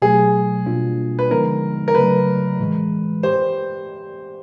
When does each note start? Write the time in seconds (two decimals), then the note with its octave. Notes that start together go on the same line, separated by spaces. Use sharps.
0.02 B2 F#3 A3 G#4
0.66 B2 G3 A#3 D4 F4
1.19 B4
1.30 D3 F3 G#3 B3 D#4 A#4
1.88 A#4
1.95 C#3 F#3 A3 B4
2.59 A2 E3 G#3
3.23 G4 C5